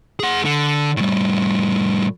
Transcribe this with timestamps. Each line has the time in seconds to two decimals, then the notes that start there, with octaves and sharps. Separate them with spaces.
0.20 G#4 F#5
0.45 D3
0.97 A2 G3